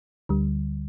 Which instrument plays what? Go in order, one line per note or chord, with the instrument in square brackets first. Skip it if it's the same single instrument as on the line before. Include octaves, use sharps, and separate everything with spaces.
[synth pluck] D2 D3 G3